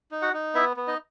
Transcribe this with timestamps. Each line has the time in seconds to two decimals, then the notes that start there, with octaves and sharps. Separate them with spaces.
0.11 D#4
0.22 F#4 F#5
0.34 D#4
0.54 B3 E4 E5
0.77 B3
0.88 D#4 D#5